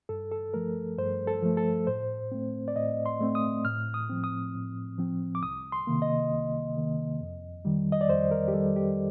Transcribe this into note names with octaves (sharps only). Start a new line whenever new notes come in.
G2 A4
A4
F3 A3 A#4
G2 C5
A4
F3 A3
A4
A2 C5
A3 C4
D5
A2 D#5
C6
A3 C4
D#6
A2 F6
D#6
F3 C4
D#6
A2
F3 C4
D6
C2 D#6
C6
C3 D#3 A#3
D#5
C2
C3 D#3 A#3
F2
D#3 G3
D#5
D5
F2 C5
A#4
G4
D#3 G3 A4
G4